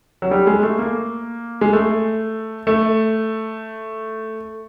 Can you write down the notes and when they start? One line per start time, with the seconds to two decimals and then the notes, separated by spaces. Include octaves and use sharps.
0.22 F#3
0.31 G3
0.47 G#3
0.63 A3
0.79 A#3
1.61 G#3
1.73 A3
2.67 A3